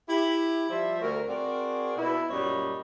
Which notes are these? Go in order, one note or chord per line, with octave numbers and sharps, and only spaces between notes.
E4 G4
F3 G3 C5 E5
D2 A3 F#4 A#4
C4 F#4 G#4 A#4 D5
B2 E4
F#2 A#2 G3 C#5 D#5